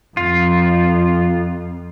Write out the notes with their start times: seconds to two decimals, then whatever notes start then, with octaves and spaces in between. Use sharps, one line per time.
0.17 F2 F4